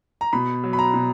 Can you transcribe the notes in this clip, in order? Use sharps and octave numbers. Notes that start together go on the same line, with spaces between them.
A#5
B2 B5
F#3
B5
A#5
B2